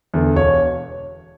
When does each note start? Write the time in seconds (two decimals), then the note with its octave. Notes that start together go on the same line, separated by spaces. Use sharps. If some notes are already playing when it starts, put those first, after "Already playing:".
0.14 E2 D3
0.36 E1 C#5